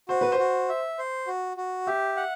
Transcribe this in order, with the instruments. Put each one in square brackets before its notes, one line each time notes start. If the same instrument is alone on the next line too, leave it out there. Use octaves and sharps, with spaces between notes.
[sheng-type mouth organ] F#4 [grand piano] C5
[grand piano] B4
C5
[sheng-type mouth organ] F#4
E5
C5
F#4
F#4
[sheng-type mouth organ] G4 [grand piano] E5
[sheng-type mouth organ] F#5